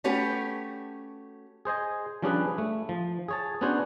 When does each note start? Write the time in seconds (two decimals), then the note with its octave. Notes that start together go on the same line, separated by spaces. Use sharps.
0.04 A3 C#4 F#4 G4 B4
1.65 G#4 C5 D#5 G#5
2.22 F3 G3 C#4 D4 G#4 B4
2.58 A3
2.89 F3
3.28 G#4 C#5 A5
3.61 B3 C#4 D4 F#4 C5 C#5